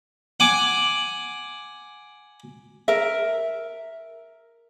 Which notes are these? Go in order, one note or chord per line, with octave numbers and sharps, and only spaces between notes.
F#5 G#5 D6
A#4 E5